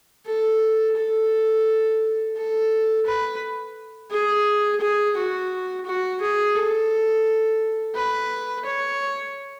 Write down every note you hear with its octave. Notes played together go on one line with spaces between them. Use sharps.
A4
A4
A4
B4
G#4
G#4
F#4
F#4
G#4
A4
B4
C#5